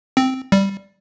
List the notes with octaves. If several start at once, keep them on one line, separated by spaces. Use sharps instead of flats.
C4
G3